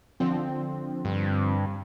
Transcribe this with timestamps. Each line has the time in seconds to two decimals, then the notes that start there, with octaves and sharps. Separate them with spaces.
0.20 D3 F3 C4
1.05 G2